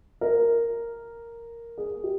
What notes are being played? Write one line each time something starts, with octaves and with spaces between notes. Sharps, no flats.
A#4
G#4
G4